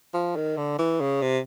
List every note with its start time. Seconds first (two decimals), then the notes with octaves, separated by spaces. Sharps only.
0.14 F3
0.36 D#3
0.57 D3
0.78 E3
1.01 C#3
1.22 C3